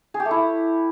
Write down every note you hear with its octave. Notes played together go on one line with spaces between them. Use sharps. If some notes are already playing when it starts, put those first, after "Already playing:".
G#4
G4
A3
E4